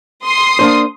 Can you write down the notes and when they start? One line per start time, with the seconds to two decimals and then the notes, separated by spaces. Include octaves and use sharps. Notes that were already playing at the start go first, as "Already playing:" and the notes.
0.23 C6 D#6 C7
0.59 A#3 D4 C5